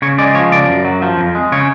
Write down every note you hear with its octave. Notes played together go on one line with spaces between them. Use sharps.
C#3 C#5
G#3 D5
F3 C#5
C#3 D5
F#2
F#3
F3
F2
G#3
C#3 C#5